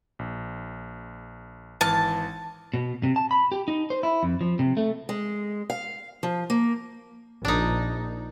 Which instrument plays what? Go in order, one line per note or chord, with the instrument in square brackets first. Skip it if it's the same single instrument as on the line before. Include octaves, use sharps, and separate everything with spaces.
[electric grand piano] A#1
[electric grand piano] G#1 E3 F6 [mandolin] A5
[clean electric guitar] B2
C3
A5
B5
G4
D#4
C5
E4
F2
F3
C3
A3
[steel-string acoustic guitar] G#3
F5
F3
A#3
[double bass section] A#1 [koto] D4 D#4